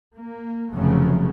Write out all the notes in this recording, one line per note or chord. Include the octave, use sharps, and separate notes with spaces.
A#3
F1 C#3 F3 F#3 A3